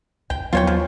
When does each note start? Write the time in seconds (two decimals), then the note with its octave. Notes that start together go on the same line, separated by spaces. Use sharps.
0.30 C#2 G5
0.53 D#2 F#3 B3 F4 C#5 G5
0.67 F3